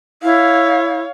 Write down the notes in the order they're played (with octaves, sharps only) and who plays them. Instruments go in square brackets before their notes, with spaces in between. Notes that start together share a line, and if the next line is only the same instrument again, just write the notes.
[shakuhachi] E4 [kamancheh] C#5 F5